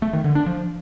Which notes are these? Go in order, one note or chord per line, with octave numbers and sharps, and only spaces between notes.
A3
D#3
D3
D4
F3